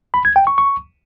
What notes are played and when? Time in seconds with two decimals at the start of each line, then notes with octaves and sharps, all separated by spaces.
0.14 B5
0.25 G#6
0.36 G5
0.47 C#6
0.58 C#6